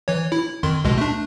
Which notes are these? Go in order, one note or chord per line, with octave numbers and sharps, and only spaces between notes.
E3 C#5
E4
F2 D#3 C6
C#2 B2 G#3
A3 D4